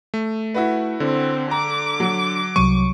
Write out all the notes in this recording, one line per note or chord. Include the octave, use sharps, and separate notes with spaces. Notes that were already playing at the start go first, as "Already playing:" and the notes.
A3
E4 F#4 B4
D3 C4
A#5 D6
F#3
C2 C3 F#3 C#6 D#7